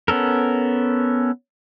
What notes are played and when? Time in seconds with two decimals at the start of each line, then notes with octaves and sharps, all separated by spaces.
0.08 B3 C#4 A4 A#4